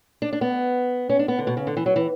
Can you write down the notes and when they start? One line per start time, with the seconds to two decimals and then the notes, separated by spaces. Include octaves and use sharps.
0.22 D4
0.33 D4
0.41 B3
1.10 C#4
1.19 D4
1.28 B3
1.39 D3
1.47 B2
1.57 C#3
1.67 D3
1.77 E3
1.86 F#3
1.96 E3